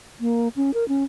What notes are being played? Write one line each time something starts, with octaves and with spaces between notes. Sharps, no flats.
A#3
C#4
A#4
C#4